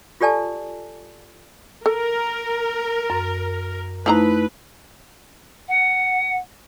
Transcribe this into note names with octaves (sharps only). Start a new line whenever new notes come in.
F4 G4 A4 D5 G#5 A5
A4 A#4
F#2
F3 A3 C4 D#4 E4 B4 A#5
F#5